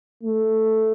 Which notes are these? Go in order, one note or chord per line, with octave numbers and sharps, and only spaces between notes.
A3